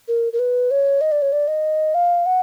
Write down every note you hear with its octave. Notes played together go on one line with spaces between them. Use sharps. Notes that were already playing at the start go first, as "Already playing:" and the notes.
A#4
A#4
B4
C#5
D#5
D5
C#5
D5
D#5
F5
F#5